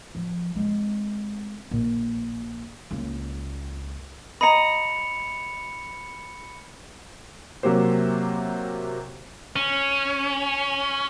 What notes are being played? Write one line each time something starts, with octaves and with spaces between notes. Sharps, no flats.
F3
G#3 C4
A#1
C#2 A#3
D#5 A#5 B5 C#7 F7
C3 F#3 A#3 G4 C5
C#4